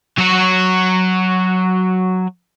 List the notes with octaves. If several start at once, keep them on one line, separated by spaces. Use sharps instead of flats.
F#3 F#4